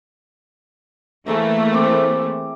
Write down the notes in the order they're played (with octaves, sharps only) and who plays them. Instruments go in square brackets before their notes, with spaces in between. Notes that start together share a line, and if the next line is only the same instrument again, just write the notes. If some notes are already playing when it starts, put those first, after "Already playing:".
[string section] E3 A3 A#3 [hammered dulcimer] G#4 E5 A#5
[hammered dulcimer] C4 D6